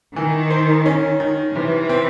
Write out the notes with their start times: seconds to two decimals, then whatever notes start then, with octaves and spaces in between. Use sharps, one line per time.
0.16 D#3 E3
0.50 C5
0.86 C#4
1.20 D#3
1.55 C3 E3
1.89 C4